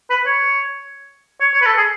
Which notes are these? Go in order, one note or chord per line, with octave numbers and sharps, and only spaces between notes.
B4
C#5
C#5
C#5
B4
A4
G#4